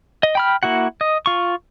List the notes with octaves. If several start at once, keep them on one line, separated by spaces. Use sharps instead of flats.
D#5
G5 B5 F6
A#3 E4 F#4 F#5
D#5
F4 C#6